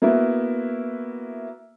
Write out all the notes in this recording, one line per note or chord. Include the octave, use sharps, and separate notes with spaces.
A#3 B3 E4 F#4 E5